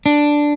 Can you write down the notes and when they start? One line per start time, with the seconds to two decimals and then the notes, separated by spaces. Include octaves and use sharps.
0.06 D4